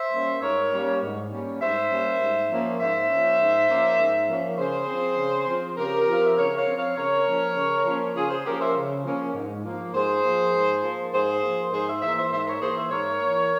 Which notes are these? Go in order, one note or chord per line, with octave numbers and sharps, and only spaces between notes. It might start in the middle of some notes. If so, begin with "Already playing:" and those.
Already playing: C5 E5
G3 A#3 C#4
G#2 A#4 C#5
G3 A#3 C#4
G#2
G3 A#3 C#4
G#2 C5 E5
G3 A#3 C#4
G#2
F3 A#3 C#4
G#2 C5 E5
F3 A#3 C#4
G#2
F3 A#3 C#4
G#2
F3 A#3 C#4
C#3 G#4 C5
F3 C4
C#3
F3 C4
C#3 G4 A#4
F3 C4
F5
E5
C#3 A#4 C#5
C#5 F5
F3 C4
C#5 F5
C#3 A#4 C#5
F3 A#3 C#4
C#3
F3 A#3 C#4
C#3 F4 G#4
G#4 C5
F3 A#3 C#4 G4 A#4
C5 E5
C#3
F3 A#3 C#4
G#2
F3 A#3
G#2 G#4 C5
F3 A#3
G#2
F3 A#3
G#2 G#4 C5
F3 A#3
G#2 G#4 C5
C5 E5
E3 A#3 C5 E5
C5 E5
G#2 C5 E5
A#4 C#5
E3 A#3 G#4 C5
C5 E5
G#2 A#4 C#5
E3 A#3